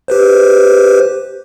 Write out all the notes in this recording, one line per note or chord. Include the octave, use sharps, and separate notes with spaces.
G4 B4 C5